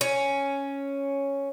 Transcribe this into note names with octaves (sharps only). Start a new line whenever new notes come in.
C#4